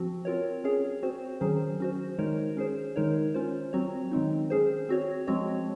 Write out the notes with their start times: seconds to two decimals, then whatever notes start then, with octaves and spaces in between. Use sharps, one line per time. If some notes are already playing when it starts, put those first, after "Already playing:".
Already playing: F3 C4 F#4
0.25 C4 F4 A#4 C#5
0.64 C#4 G#4 C#5
1.03 C4 F#4 C5
1.41 D#3 F#3 C#4 G#4 C5
1.80 C#4 F#4 C5
2.18 D#3 G#3 D#4 A#4 C#5
2.57 C#4 G#4 C5
2.96 D#3 G#3 D#4 A#4 C#5
3.34 C#4 F4 C5
3.73 F#3 C4 F#4 C#5
4.11 D#3 G#3 C4 D#4
4.50 C#4 G#4 C5
4.89 C4 F#4 C#5
5.27 F3 G#3 C4 F#4 C#5